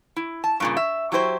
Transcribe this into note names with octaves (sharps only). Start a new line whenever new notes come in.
E4
A5
G2 A#2 C#3
E5
F#3 E4 G4 B4 C5